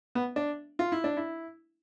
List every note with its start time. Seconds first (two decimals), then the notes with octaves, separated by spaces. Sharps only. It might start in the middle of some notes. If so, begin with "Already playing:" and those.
0.15 B3
0.36 D4
0.79 F4
0.92 E4
1.04 D4
1.17 E4